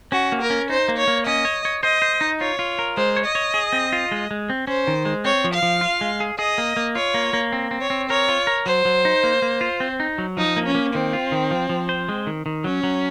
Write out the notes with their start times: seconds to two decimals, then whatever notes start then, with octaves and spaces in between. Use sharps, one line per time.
0.12 C#4 F#4
0.32 A#3
0.41 A#4
0.50 C#4
0.70 D#4 C5
0.88 A#3
0.98 C#5
1.08 A#3
1.27 C#4 D#5
1.45 C#5
1.65 C#5
1.83 C5 D#5
2.02 C5
2.21 D#4
2.41 F4 C#5
2.59 F4
2.79 A#4
2.97 G#3 C5
3.17 C#5
3.25 D#5
3.35 C#5
3.54 G#4
3.73 C4
3.93 F4
4.11 G#3
4.31 G#3
4.50 C4
4.67 C#4 C5
4.87 D#3
5.05 G#3
5.25 C4 C#5
5.44 F3
5.53 F5
5.62 F3
5.81 F4
6.01 G#3
6.20 G#4
6.39 G#4 D#5
6.58 A#3
6.77 A#3
6.95 F4 C#5
7.14 A#3
7.33 A#3
7.52 C4
7.71 C4
7.81 C#5
7.90 C4
8.10 A#4 C#5
8.29 F4
8.47 A#4
8.66 F#3 C5
8.85 F#3
9.05 D#4
9.23 A#3
9.42 A#3
9.61 F4
9.80 C4
10.00 D#4
10.18 F#3
10.37 F3 D#4
10.57 A#3
10.66 C#4
10.75 A#3
10.94 D#3 C4
11.13 F4
11.32 D#3
11.51 F3
11.69 F3
11.89 C5
12.09 G#3
12.27 D#3
12.46 D#3
12.64 F#3 C#4
12.83 F#3